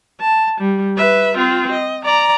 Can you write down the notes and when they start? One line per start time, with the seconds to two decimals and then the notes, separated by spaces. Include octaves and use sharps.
0.21 A5
0.61 G3
0.97 B4 E5
1.36 C4 F4
1.72 D#5
2.05 D5 A#5